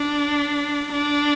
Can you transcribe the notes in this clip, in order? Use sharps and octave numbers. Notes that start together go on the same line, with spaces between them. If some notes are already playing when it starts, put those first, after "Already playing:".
Already playing: D4
D4